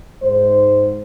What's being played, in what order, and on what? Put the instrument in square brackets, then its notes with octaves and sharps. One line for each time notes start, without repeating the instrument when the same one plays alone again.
[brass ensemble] G#2 C5